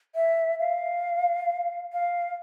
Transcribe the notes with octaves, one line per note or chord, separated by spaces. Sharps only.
E5
F5
F5